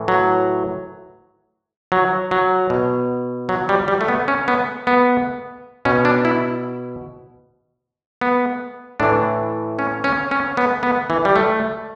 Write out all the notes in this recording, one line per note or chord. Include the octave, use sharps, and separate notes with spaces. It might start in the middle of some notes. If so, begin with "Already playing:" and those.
Already playing: A2 E3
F#3
F#3
F#3
B2
F#3
G3
G3
A3
B3
C#4
B3
B3
B2 C#4
D4
E4
B3
A2 E3 D4
C#4
C#4
C#4
B3
B3
E3
G3
A3